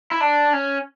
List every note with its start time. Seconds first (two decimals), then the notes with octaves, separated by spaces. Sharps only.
0.11 E4
0.21 D4
0.53 C#4